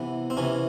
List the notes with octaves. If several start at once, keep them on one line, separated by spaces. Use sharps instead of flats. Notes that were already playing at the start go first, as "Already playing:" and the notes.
Already playing: C3 E3 B3
C4
C3 E3 C#4